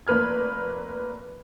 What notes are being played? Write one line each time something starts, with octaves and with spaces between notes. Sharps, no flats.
F1 A#3 B4 F6 G#6